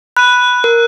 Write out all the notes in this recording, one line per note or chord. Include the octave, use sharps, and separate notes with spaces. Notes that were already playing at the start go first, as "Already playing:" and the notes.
B5 F#6 D#7
A#4